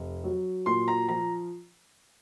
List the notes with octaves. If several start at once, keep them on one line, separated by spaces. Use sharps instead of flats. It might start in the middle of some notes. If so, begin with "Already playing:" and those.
Already playing: F1
F#3
A#2 C6
A#5
F3 A#5